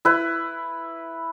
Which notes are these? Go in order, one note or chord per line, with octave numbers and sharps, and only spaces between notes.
E4 B4